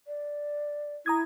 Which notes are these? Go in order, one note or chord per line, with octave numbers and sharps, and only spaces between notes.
D5
E4 A#5 D#6 G#6